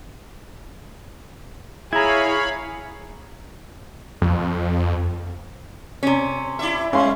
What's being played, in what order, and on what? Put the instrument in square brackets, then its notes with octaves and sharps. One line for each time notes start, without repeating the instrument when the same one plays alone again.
[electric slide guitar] E4 [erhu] G#4 [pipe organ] C#5 F5 B5 [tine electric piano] A#5 G#6
[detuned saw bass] F2
[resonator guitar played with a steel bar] C3 C#4
[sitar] E4 D5 E5
[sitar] G#3 [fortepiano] C#4 F5 C6